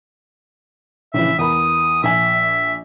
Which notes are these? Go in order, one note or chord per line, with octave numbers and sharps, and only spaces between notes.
A#1 C#3 E3 E5
E2 A#4 B5 D#6
A#1 E5 G#5